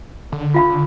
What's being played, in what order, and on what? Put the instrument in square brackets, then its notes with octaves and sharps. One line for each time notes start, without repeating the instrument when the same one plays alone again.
[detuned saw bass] D3
[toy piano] F4 F5 B5